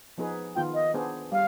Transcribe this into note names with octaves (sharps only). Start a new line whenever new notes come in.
F3 B3 D#4 G#4 B4
D#3 B3 F4 G5
D#5
B3 D4 G#4 C5
G3 F5